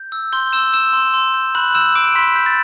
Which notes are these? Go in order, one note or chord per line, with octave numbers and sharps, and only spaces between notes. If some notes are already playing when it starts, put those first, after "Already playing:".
Already playing: G6
E6
C6 G6 G7
C6 E6 E7
E6 G6 E7
C6
C6
G6
B5 F#6 F#7
E6 G6 E7
D6 D7
B5 C6 B6
G6
A6